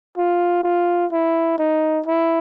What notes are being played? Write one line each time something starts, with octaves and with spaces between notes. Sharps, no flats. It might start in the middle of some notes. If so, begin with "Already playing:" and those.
F4
F4
E4
D#4
E4